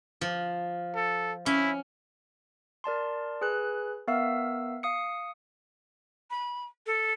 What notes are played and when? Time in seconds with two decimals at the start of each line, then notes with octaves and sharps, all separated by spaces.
0.21 F3
0.96 A4
1.46 C#4 E4
2.84 A#4 D5 A5 C6
3.41 G#4 B4 G#5 F#6
4.08 B3 A#4 E5 F5 E6 F6
4.83 F5 D#6 C#7
6.31 B5
6.86 A4